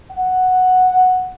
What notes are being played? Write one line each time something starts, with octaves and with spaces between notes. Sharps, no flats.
F#5